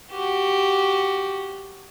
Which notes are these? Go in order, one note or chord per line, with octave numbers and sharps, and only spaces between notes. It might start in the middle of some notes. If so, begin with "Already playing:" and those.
F#4 G4